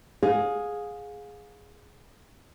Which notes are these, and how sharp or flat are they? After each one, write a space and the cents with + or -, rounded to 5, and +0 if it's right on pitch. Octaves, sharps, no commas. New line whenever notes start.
G#4 +0 F5 +30